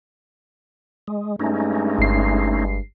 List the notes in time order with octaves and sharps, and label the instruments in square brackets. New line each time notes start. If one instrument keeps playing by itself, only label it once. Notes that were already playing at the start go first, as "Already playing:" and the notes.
[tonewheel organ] G#3
[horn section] G2 G#3 [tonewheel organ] A3 C#4 D#4
[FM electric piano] G1 C7